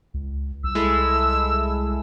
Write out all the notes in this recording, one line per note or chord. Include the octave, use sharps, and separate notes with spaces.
C#2
C2 E6
G#3 E4 A4